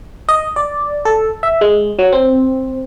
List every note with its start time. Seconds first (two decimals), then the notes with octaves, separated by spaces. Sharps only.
0.29 D#5
0.56 D5
1.05 A4
1.43 E5
1.61 G#3
1.99 F#3
2.12 C4